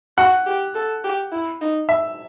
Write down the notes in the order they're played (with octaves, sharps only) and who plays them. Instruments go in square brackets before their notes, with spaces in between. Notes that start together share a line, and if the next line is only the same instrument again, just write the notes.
[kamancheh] F#4 [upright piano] F#5
[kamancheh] G4
A4
G4
E4
D#4
[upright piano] E5